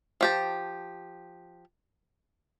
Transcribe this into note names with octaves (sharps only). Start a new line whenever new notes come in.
F3 G4 A5